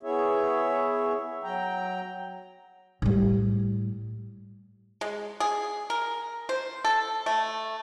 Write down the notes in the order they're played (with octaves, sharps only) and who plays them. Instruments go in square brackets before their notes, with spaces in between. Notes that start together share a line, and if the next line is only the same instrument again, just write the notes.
[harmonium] B3 E4 G#4 C#5 E5
F#3 G5 A#5
[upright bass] A2 G3
[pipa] G#3
G#4
A#4
C5
A4
A3